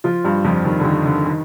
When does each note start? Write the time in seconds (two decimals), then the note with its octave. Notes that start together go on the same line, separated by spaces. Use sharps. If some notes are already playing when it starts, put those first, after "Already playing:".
0.04 F3 F4
0.24 G2 G3
0.44 F2 F3
0.65 D#3
0.80 D3
0.85 D#3
1.05 D3
1.26 D#3